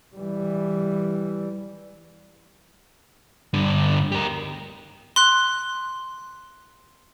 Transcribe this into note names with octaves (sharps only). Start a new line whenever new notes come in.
E3 G3
G2 D3
G4 A#4
C6 F#6